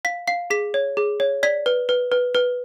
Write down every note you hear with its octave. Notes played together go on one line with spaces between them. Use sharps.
F5 B6
F5 C7
G#4 B6
C#5
G#4
C#5
D5 B6
B4
B4
B4
B4